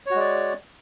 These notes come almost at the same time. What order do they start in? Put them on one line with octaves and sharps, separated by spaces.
C#5 F#4 G#3 D5